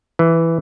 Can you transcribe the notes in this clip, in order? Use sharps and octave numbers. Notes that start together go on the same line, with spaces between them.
E3